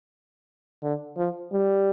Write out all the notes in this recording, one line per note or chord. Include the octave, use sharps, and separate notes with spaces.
D3
F3
G3